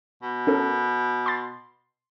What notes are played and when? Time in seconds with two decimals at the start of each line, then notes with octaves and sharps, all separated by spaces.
0.22 B2
0.47 C#4 A4 A#4
1.26 C6 A6